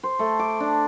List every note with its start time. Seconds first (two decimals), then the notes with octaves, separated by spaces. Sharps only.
0.03 C5
0.19 A3
0.39 D6
0.60 D4